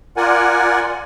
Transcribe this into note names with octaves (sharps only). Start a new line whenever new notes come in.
F4 A#4 D5 F#5 G#5